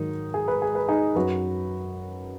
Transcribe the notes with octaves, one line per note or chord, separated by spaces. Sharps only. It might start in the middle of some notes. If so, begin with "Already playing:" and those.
Already playing: G#2 D#3 F#3 D#4
G#4
B4
G#4
B4
D#4 G#4
F#2 F#3 F#4 B4